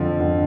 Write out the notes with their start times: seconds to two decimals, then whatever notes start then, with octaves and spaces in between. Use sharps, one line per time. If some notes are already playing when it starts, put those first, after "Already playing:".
Already playing: F2 D3 F3
0.19 F2 D3